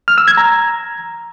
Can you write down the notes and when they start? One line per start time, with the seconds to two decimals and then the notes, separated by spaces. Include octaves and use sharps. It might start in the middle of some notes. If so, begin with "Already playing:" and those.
0.08 F6
0.18 E6
0.28 G#6
0.37 A#5